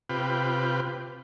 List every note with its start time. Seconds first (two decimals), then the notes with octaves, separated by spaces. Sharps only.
0.10 C3 F4 B4 G5